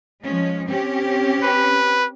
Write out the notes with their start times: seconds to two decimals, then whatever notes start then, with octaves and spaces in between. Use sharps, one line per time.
0.24 F3 G#3 C#4
0.69 C4 C#4 G4
1.43 B4